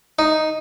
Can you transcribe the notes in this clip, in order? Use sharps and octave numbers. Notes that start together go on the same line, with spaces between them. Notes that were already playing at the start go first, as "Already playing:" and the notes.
D#4